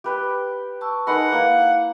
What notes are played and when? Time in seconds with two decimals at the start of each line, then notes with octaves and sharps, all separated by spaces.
0.04 G4 B4 G5
0.81 A5 C#6 E6
1.07 G#3 D#4 A#4 B4 F#5
1.32 A#3 E4 F5